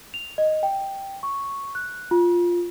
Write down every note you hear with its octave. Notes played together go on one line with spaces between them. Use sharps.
F7
D#5
G5
C#6
F#6
F4